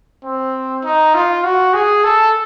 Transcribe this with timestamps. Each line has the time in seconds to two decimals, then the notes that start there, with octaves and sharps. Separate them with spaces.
0.24 C4
0.84 D#4
1.14 F4
1.44 F#4
1.74 G#4
2.04 A4